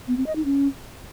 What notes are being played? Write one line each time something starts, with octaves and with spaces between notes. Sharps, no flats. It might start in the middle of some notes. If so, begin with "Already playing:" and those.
B3
C4
D#5
D#4
C#4